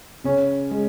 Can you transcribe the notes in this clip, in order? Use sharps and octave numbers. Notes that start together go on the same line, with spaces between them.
C#3 C#4
G#3